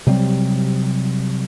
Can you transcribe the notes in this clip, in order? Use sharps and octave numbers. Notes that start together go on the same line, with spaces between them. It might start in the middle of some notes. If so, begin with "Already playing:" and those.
C3 F#3 G3 C4